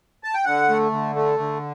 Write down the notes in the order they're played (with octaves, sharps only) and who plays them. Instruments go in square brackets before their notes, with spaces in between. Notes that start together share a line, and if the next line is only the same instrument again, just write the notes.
[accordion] A5
G5
D3 F#5
A3
D3
A3
D3